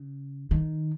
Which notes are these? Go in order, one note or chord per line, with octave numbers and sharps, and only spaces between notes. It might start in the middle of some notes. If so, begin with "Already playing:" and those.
Already playing: C#3
D#3